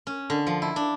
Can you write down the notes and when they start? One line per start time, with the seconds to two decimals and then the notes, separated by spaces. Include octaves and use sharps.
0.07 C#4
0.30 D3
0.47 F3
0.62 E4
0.76 D4